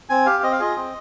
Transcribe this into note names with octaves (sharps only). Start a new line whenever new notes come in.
C4 G#5
G4 F5
C4 D#5
F5
F4 G#4 D#5
C4